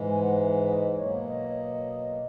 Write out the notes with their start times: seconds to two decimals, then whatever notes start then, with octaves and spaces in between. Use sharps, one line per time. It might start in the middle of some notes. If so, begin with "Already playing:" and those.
Already playing: G#2 E3 G#3
0.10 G#5
0.23 F#5
0.37 E5
0.67 D#5
0.97 B2 F#3 A#3 C#5
1.28 D#5